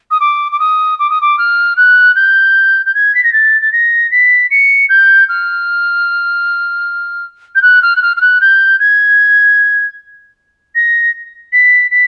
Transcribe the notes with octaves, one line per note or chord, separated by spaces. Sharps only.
D#6
D6
D6
D#6
D6
D#6
D6
F6
F#6
G6
G6
G#6
B6
A#6
A6
A6
A#6
B6
C#7
G6
F6
G6
F#6
F6
F#6
F6
F6
F#6
G6
G#6
A#6
B6
B6